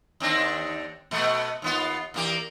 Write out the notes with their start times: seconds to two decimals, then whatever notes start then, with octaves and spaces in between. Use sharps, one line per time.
0.20 D#2 C4 D4
1.11 B2 A3 B3
1.62 D#2 B3 F4
2.14 E2 A#3 G4